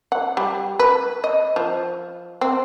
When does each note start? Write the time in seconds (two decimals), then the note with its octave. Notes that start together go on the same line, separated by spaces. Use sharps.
0.12 F#5
0.37 G3
0.79 B4
1.24 D#5
1.56 F3
2.41 C4